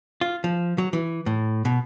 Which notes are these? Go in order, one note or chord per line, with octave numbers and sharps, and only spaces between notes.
F4
F3
F#3
E3
A2
B2